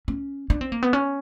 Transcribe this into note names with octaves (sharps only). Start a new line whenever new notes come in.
C#4
D4
C4
A#3
B3
C#4